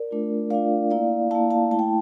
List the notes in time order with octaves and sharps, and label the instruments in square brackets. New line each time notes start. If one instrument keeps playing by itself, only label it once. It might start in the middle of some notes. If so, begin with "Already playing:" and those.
Already playing: [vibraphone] A#4 D5
A3 D4 F4
A3 D4 F4 D5 F5
A#3 E4 D5 F5
A#3 E4 F5 A5
F5 A5
A3 E4 A5
G5